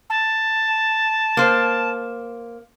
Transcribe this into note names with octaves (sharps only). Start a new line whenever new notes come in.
A5
A#3 C5